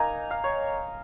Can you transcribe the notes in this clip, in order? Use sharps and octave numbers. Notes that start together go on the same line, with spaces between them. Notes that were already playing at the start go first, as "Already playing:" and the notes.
Already playing: A#3 D#4 G#5 A#5
F5
C#5